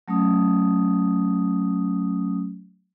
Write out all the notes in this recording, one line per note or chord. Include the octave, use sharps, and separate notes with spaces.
F#3 A3 C#4 D#6